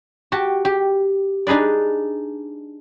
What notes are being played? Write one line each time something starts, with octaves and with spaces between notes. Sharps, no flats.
F#4 G4 G5 A5
G4
D4 D#4 G#4 B4 D5